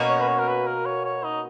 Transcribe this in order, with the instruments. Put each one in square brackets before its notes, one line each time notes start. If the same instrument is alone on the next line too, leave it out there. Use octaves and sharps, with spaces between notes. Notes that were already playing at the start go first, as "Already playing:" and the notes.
Already playing: [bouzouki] B2 A#3 C#4 F#4
[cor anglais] C#5
B4
C#5
A#4
B4
A#4
C#5
C#5
D#4